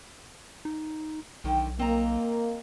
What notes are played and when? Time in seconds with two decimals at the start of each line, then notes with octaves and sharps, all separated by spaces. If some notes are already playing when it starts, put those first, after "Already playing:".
0.65 D#4
1.44 B1 D3 D#3 G5
1.79 A#3 C4 D#5 A#5